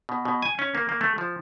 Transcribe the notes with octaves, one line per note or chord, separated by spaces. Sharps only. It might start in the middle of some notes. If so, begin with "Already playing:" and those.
B2
B2
G#5
C#4
A#3
A#3
A3
F3